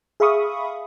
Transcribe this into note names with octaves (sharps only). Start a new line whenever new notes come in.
G#4 E5 F5 B5 C#6 D#6